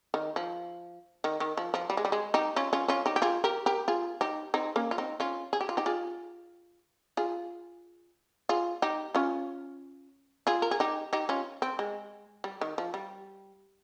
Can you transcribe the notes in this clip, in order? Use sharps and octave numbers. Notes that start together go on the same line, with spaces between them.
D#3
F3
D#3
D#3
F3
F3
G3
G#3
G3
G#3
D#4 G4
C#4 F4
C#4 F4
C#4 F4
D#4 G4
G4
F4 G#4
G4 A#4
G4 A#4
F4 G#4
D#4 G4
C4 D#4
A#3 C#4
F4
C4 D#4
C#4 F4
G#4
G4
F4
D#4 G4
F4 G#4
F4 G#4
F4 G#4
D#4 G4
C#4 F4
F4 G#4
A#4
G#4
D#4 G4
D#4 G4
C#4 F4
C4
G#3
G3
D#3
F3
G3